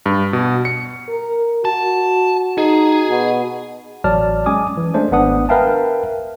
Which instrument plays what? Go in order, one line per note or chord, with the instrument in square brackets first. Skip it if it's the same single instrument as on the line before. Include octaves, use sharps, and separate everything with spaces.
[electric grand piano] G2
B2
C#7
[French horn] A#4
[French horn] F#4 [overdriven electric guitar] A5
[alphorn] D#4 [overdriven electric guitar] G#4
[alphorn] B2
[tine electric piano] A1 F#3 D5 A5 F6
G#3 C#4 G#5 D6 D#6
E3
G#3 A3 D4 C5
G#1 B3 D4 F#5 D#6
A#4 B4 E5 F5 G5 A5